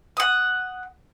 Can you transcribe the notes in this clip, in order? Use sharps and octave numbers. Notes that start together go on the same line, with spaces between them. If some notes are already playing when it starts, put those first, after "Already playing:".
F#5 D#6